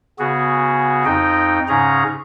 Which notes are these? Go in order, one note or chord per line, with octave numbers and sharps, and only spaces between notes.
C#3 B3 F#4 G#4
F2 D#4 D#5 G5
G#2 C#3 C#4 G#4 A#5